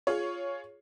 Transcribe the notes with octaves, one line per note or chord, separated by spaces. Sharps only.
F4 G#4 C#5